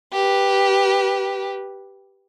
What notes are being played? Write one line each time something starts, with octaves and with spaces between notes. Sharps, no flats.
G4 B4